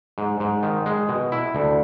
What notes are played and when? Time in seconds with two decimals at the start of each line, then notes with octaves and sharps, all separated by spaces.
0.18 G#2
0.40 G#2
0.63 D#3
0.86 G#3
1.09 B2
1.32 E4
1.55 D2